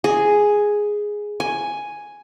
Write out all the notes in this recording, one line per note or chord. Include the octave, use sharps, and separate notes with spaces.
G#4
G#5